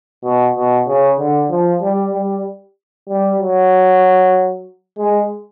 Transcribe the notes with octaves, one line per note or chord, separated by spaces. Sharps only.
B2
B2
C#3
D3
F3
G3
G3
G3
F#3
G#3